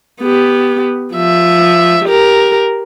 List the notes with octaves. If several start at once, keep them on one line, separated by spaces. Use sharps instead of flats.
B3 G4
F3 E5
G4 A#4